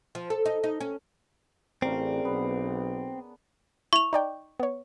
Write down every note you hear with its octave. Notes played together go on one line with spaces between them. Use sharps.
F3
A4
D#4
D#4
C#4
A1 C#3 C4 D4 A#4
B1 B3
E4 C#6 F7
D#4 D5 G5
B3 C#5